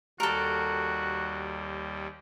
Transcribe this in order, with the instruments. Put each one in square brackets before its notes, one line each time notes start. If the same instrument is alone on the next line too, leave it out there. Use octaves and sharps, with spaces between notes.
[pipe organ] D#2 G3 [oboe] F#4 [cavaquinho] A4 A#4